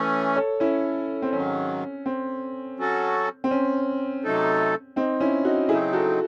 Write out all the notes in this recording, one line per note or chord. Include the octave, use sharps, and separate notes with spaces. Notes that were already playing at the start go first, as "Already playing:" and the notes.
Already playing: E3 A3 C#4
A4 C#5
C#4 E4
C4
G#2 D#3 F#3 C#4
C4
F#3 C#4 F#4 A4
C4
C#4
C3 F#3 A3 D#4 A4
C4 D#4
C#4 E4
D#4 F#4
C#3 F#3 C4 D#4 E4 G#4
F#4 A4